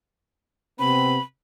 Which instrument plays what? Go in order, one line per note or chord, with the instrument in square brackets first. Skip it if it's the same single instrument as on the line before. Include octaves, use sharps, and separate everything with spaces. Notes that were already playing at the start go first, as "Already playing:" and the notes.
[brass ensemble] C3 B3 C4 [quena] B5